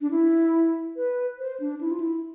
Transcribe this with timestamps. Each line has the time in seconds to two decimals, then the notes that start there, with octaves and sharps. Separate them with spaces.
0.01 D4
0.11 E4
0.96 B4
1.39 C5
1.60 D4
1.81 E4
1.91 F4
2.00 E4